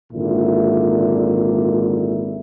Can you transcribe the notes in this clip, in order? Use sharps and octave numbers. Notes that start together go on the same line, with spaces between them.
G#1 A#2 D3 E4